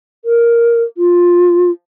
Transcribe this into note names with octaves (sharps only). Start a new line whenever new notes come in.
A#4
F4